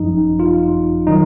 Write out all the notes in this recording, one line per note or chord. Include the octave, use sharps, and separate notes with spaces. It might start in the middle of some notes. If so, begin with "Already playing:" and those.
Already playing: G#1 F#2 F3 D#4
F4
D#3 F#3 D#4